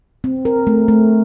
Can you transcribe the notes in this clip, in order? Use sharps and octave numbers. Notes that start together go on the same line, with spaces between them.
C4
A#4
A3
A3